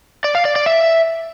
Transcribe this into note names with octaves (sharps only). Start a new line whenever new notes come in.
D5
F5
D5
D5
E5